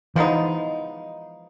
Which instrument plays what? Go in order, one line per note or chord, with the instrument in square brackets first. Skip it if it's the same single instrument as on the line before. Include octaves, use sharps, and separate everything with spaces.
[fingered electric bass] E3 [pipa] F3 G#3 B3 D#4